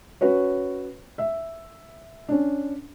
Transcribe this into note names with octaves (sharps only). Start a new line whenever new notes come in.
C#4 F#4 B4 C#5
E5
C#4 D4